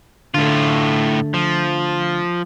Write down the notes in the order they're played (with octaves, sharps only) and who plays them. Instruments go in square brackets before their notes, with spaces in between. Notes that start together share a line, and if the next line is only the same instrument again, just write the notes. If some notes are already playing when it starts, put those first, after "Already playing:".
[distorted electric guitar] A2 F4 [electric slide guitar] D3 A3
[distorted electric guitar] F3